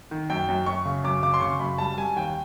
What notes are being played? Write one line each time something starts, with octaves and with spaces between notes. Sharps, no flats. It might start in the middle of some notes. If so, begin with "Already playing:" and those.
D#3
F#2 G5
F#2
F#2 C#6
C#3
F#2 D6
C#3 D6
C6
C#3 C#6
F#2 B5
G3 A5
G3 G#5
D#2 G5